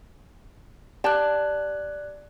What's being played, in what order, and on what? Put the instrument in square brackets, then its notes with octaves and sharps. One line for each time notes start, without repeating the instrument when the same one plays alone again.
[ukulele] G4 G5 A5 [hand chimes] D5 F#6